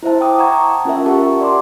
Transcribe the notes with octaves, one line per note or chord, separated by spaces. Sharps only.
E4 C5 E5 A5
G5 D6 D#6
F#5 A5 A#5 C#6 G#6
C#4 F4 A#4 E5
G4 A#4 F#5 A5 C#6
D5 C6 D6